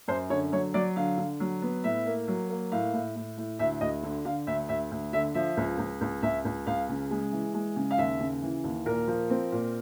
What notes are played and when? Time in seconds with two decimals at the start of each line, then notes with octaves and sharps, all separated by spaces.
0.08 F#2 C5
0.30 D3 C#5
0.52 F#3 C#5
0.74 F#3 D5
0.96 D3 F5
1.18 D3
1.40 F#3
1.62 B3
1.84 A2 E5
2.06 A#3
2.28 F#3
2.49 A#3
2.72 A2 F5
2.94 A2
3.16 A2
3.38 A2
3.59 D2 E5
3.81 D2 D#5
4.03 D3
4.25 D3 F5
4.47 D2 E5
4.69 D2 E5
4.91 D2
5.13 D3 E5
5.34 F3 E5
5.57 C#2
5.78 C#2
6.01 C#2
6.22 C#2 E5
6.45 C#2
6.67 C#2 F5
6.89 C#3
7.11 G#3
7.32 E3
7.54 G#3
7.76 C#3
7.91 F5
7.98 D#2 E5
8.20 C#3
8.42 E3
8.64 D#2
8.86 A#2 A#4
9.08 F3
9.30 C4
9.52 A#2